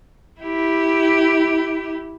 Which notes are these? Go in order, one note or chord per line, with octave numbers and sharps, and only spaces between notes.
E4 G4